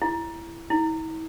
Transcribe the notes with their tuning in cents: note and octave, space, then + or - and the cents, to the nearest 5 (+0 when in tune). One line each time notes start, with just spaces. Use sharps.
E4 +20
E4 -40